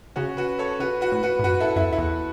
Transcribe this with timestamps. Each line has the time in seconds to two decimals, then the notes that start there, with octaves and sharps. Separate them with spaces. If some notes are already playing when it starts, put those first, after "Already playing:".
0.16 C#3 C#4 F#4
0.37 F#4 B4
0.59 A4 C#5
0.80 C#3 F#4 B4
1.01 F#4 B4
1.12 A2
1.23 F#4 B4
1.39 A2
1.44 F#2 F#4 B4
1.60 E4 A4
1.76 F#2 E4
1.83 E2
1.92 E4
1.98 E2